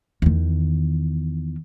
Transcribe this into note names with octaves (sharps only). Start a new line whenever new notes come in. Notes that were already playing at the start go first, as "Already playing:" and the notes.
E2 D#3